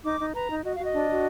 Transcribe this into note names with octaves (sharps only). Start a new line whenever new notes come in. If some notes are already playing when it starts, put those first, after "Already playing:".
D#4 D6
D#4
B4 A#5
D#4
F#4 D#5
F#4 F5
D#5
D4
F#4